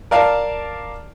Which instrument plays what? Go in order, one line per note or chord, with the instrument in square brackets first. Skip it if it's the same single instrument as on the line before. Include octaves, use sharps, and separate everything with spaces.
[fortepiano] A#4 D5 F5 A5